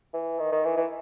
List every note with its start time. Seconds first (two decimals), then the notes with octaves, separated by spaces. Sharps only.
0.14 E3
0.39 D#3
0.52 D#3
0.65 E3
0.77 E3